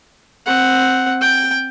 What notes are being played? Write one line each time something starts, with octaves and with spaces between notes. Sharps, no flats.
C4 F#5
G5